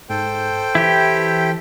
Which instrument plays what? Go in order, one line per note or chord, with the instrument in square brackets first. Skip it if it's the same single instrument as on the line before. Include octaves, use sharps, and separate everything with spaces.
[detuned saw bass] G#2 [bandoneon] A4 C5 G5
[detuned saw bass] E3 [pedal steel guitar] E4 G4